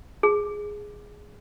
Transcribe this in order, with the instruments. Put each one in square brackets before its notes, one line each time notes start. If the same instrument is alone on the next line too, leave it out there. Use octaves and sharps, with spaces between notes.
[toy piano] G#4